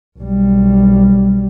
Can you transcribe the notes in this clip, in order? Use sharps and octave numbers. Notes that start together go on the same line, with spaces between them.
B1 G3